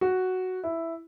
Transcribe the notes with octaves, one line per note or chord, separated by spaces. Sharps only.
F#4
E4